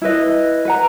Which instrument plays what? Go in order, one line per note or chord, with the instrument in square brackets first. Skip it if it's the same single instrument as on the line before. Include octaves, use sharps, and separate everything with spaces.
[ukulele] E4 B4 D#5
B4 F#5 A#5